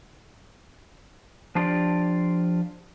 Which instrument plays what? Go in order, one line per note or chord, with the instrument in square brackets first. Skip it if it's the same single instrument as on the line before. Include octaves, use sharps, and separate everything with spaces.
[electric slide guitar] F3 D4 F4 G4 D5